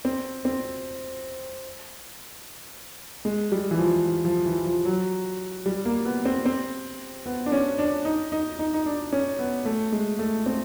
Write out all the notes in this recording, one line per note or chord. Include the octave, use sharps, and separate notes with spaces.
C4
C4
G#3
G3
E3
F3
E3
F3
E3
F3
F#3
G3
A#3
B3
C4
C4
B3
D4
C#4
D4
D#4
D#4
D#4
D#4
D4
C#4
B3
A3
G#3
A3
C4